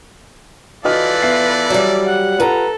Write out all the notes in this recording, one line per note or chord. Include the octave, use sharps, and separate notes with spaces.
E3 F4 F#4 A4 B4 D5 D#5 F6
B3 E5 C7
F#3 G3 E5
F#5
F4 G4 A4 B4 F#5 A#5